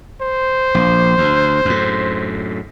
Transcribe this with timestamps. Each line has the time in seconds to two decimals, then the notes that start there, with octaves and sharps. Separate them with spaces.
0.21 C5
0.74 A#1
1.18 D2
1.65 F#2 A2